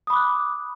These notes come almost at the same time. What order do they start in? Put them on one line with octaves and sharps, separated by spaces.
D#6 B5 D6 F#6